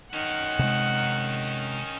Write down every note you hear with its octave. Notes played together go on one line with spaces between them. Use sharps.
D#3 C#4 D#4 A#4 F#5
C3 G#3